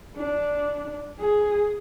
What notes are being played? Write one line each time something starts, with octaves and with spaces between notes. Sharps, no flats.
D4
G#4